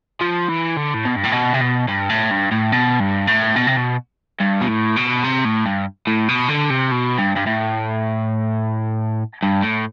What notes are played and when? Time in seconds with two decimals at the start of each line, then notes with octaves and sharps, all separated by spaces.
0.21 F3
0.49 E3
0.77 D3
0.94 A2
1.05 B2
1.16 G2
1.25 A2
1.33 B2
1.54 C3
1.61 B2
1.88 G2
2.10 A2
2.31 G2
2.52 A2
2.72 B2
3.00 G2
3.28 A2
3.56 B2
3.67 C3
3.77 B2
4.40 G2
4.61 B2
4.68 A2
4.96 B2
5.24 C3
5.45 A2
5.66 G2
6.07 A2
6.29 B2
6.49 D3
6.70 C3
6.91 B2
7.18 G2
7.37 G2
7.47 A2
9.43 G2
9.63 A2